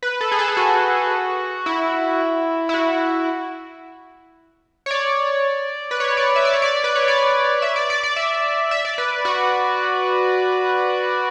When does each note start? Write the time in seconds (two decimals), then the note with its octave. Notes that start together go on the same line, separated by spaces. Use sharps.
0.03 B4
0.21 A4
0.32 G#4
0.39 A4
0.48 G#4
0.57 F#4
1.66 E4
2.69 E4
2.74 F#4
4.86 C#5
4.91 D5
5.91 B4
6.00 C#5
6.17 D5
6.36 E5
6.45 D5
6.53 C#5
6.62 D5
6.84 B4
6.95 C#5
7.08 D5
7.62 E5
7.76 D5
7.90 D5
8.03 D5
8.16 E5
8.71 E5
8.85 D5
8.98 B4
9.25 F#4